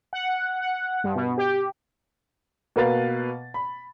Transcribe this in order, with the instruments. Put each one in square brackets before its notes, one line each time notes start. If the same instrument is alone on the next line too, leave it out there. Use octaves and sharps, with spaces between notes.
[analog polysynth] F#5
F#5
G2
B2
G4
[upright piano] B2 A#3 B4 F5 A6
B5